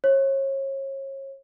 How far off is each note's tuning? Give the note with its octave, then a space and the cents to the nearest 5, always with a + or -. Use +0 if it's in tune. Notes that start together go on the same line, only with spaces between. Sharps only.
C#5 -35